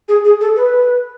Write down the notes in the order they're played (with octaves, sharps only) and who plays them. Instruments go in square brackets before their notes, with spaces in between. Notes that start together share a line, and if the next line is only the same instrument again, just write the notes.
[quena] G#4
G#4
A4
B4